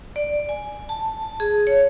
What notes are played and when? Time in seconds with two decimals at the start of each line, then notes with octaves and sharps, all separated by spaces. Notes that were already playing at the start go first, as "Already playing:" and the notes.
0.16 D5
0.49 G#5
0.89 A5
1.40 G#4
1.67 C#5